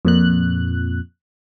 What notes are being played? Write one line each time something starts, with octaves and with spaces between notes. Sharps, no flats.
F2 A#2 F#6